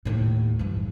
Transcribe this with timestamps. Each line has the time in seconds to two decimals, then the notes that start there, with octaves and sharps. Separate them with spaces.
0.05 D#2 A2
0.59 G2 E3